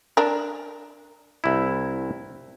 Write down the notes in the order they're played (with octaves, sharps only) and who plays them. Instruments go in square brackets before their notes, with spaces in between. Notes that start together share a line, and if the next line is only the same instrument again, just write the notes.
[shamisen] D4 A#4
[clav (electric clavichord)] C2 E4